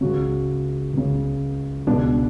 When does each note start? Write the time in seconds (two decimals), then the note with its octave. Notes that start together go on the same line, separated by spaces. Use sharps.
0.01 C#2 C#3 F#4
0.93 C#2 C#3
1.87 C#2 B2 D4